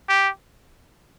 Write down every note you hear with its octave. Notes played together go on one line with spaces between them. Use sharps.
G4